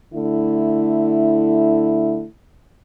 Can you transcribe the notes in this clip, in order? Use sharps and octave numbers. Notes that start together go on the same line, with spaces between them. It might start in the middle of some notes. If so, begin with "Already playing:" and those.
D3 A3 E4